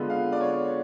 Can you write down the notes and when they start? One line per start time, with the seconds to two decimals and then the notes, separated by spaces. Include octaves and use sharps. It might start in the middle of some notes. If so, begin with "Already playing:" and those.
Already playing: D3 G#3 B3 F4
0.10 F5
0.32 D5
0.40 C#5